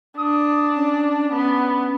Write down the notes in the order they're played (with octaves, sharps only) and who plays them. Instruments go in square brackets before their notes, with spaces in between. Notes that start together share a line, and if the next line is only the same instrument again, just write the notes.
[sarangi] D4 [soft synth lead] D#6
[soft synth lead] C#4
[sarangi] B3